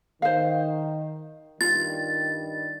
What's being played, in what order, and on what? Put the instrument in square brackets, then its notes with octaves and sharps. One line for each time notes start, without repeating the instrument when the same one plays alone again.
[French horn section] D#3 [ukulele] C5 F5
[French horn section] G2 D#3 G3 [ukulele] F4 [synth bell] A6